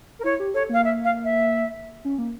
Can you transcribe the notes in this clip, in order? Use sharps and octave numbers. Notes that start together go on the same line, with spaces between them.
A#4
E4 C#5
G4
A4 C#5
A#3 F5
E5
F5
E5
C#4
A#3